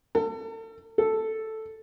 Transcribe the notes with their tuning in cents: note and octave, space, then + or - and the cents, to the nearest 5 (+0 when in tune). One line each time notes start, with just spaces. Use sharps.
A4 +35
A4 +0